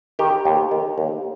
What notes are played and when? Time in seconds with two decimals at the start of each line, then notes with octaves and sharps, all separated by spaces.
0.19 D#3 G4
0.45 D#2
0.71 D#3
0.98 D#2